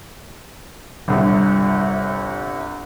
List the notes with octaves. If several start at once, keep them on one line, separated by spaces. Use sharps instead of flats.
G1 C2